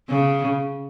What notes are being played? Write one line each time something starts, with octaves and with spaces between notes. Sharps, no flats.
C#3